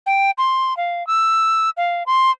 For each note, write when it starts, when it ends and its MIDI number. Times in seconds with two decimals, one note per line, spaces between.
0.06 0.31 79
0.38 0.76 84
0.77 1.06 77
1.07 1.70 88
1.77 2.03 77
2.06 2.31 84